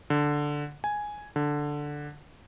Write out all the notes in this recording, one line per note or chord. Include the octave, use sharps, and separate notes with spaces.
D3
G#5
D3